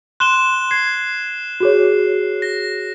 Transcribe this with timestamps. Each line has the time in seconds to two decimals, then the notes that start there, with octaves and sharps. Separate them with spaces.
0.20 C6 F#6 E7 G7
0.71 G#6 C7
1.60 F#4 G#4 C#5
2.42 A#6